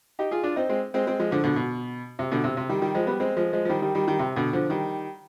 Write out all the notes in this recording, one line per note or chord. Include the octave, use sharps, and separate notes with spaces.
D#4 G4
F4 G#4
D4 F4
C4 D#4
G#3 C4
G#3 C4
G#3 C4
F3 G#3
D3 F3
B2 D3
B2
C3
B2 D3
C3
C3
D#3 G3
D#3 G3
F3 G#3
G3 B3
G#3 C4
F3 G#3
F3 G#3
F3
D#3 G3
D#3 G3
D#3 G3
D#3 G3
C3
B2 D3
D3 F3
D#3 G3